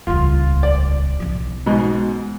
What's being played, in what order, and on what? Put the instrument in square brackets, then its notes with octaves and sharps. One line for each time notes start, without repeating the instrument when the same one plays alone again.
[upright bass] D#1 C#2 [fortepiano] F4
[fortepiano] D5
[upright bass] B1 E3
[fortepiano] G#2 B2